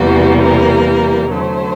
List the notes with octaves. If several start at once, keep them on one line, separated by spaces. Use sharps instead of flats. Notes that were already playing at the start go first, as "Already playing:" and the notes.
Already playing: E2 C3 E3 G3 A#3 F#4
A#4
D3 F#3 A3 C5